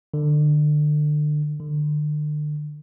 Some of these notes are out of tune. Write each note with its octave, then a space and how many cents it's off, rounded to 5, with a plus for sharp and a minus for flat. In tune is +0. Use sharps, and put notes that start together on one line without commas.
D3 +30
D3 +35